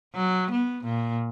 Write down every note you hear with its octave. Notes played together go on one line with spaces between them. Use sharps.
F#3
B3
A#2